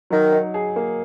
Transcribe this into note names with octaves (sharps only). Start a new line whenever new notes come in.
D#3 F#3
D#4
G#4
A#3